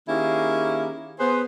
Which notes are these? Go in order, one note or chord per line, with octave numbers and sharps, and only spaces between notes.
D#3 A#3 C#4 E4 G4 G#4
B3 G#4 B4 C5